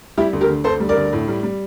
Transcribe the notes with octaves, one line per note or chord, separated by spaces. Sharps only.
G3 E4 G4
D2
G4 A#4
D3
D2 A4 C5
G3
A#4 D5
D2
A2
G3
G3